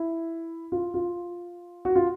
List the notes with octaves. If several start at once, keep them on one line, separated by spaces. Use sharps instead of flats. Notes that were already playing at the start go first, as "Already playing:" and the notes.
Already playing: E4
F4
F4
F#4
F4